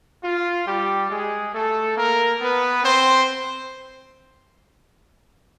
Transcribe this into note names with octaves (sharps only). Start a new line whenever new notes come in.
F4
G3 G4
G#3 G#4
A3 A4
A#3 A#4
B3 B4
C4 C5